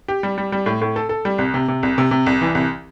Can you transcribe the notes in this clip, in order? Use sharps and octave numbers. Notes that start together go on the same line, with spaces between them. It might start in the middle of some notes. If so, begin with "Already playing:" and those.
G4
G3
G3
G3
A2
A2
A4
A4
G3
C2
C3
C3
C2
C3
C3
C2
E3
C2